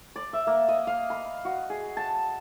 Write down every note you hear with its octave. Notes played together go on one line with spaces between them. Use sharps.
D5
E5
A#3
D#5
F5
B5
F#4
G#4
A5